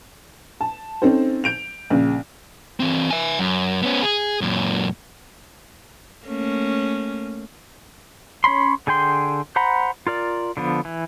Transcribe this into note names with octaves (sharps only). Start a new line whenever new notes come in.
A5
C4 C#4 D#4 A4 C5
G6 D7 F7
A#1 C#3
E3 C4
E5 G#5
F#2
B3 C#4
G#4
F#2 A#2
A3 A#3 C#4
C#4 C#5 B5 C6
D3 G#4 G5 C6
C5 F#5 A#5 B5
F4 A#4 D5
D3 F3 B3
E3